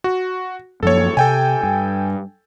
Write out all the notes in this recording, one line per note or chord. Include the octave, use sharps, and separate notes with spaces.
F#4
F#2 F3 A#3 A4 C#5
C3 A4 G5 G#5
G2